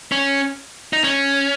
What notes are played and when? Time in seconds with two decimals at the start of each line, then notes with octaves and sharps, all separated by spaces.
0.12 C#4
0.93 D#4
1.04 C#4